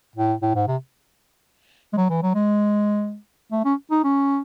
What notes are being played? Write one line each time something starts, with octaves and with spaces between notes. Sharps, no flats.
A2
A2
G#2
C3
G#3
F#3
E3
F#3
G#3
A3
C#4
D#4
C#4